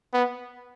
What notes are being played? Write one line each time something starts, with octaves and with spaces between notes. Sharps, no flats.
B3